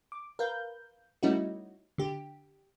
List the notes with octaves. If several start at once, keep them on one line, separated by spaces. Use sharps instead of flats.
D6
A#4 B4 F5 G6
G3 A3 C#4 D#4 E4 F#4
D3 G4